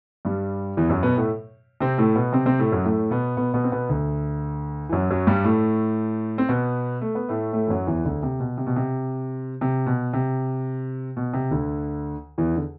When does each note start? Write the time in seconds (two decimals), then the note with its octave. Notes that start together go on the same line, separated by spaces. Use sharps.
0.25 G2 G3
0.77 E2 E3
0.90 F#2 F#3
1.03 B2 B3
1.17 A2 A3
1.80 C3 C4
1.98 A2 A3
2.16 B2 B3
2.33 C3 C4
2.46 C3 C4
2.59 A2 A3
2.72 F#2 F#3
2.84 A2 A3
3.11 B2 B3
3.37 B2 B3
3.54 B2 B3
3.64 C4
3.72 B2 B3
3.89 D2 D3
4.89 E3
4.92 F#2 F#3
5.11 F#2 F#3
5.27 G2 G3
5.44 A2 A3
6.38 C4
6.49 B2 B3
7.01 A3
7.15 B3
7.29 A2 A3
7.53 A2 A3
7.67 E3
7.70 F#2 F#3
7.87 E2 E3
8.05 D2 D3
8.23 C3
8.40 B2
8.58 C3
8.67 B2
8.76 C3
9.61 C3
9.86 B2
10.13 C3
11.17 B2
11.34 C3
11.51 D2 D3
12.38 E2 E3
12.56 D3